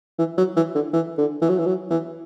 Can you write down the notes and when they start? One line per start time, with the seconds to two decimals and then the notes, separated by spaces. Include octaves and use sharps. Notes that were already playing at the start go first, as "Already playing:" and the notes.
0.18 E3
0.38 F#3
0.56 E3
0.75 D3
0.93 E3
1.18 D3
1.42 E3
1.49 F#3
1.58 E3
1.66 F#3
1.90 E3